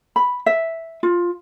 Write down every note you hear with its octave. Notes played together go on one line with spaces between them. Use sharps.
B5
E5
F4